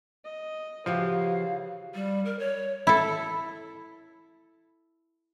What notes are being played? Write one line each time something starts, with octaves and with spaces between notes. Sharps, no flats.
D#5
C#3 E3 F3 F#4 G4 F5
G3
A#4
C#5
E4 A4